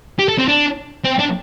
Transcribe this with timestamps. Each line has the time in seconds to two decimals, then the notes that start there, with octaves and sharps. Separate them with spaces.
0.19 G4
0.28 A4
0.38 C4
0.48 D4
1.04 C4
1.19 D4